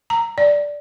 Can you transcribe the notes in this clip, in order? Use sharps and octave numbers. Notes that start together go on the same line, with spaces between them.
A#5
D5